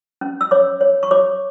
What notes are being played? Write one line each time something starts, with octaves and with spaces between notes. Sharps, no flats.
C#4
E6
C#5 D6
C#5
C#6
C#5 D6